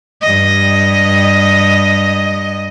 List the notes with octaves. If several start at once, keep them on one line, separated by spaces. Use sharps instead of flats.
G2 D#5